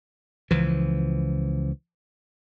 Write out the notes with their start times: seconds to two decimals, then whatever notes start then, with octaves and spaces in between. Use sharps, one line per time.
0.51 C#2 E3 F3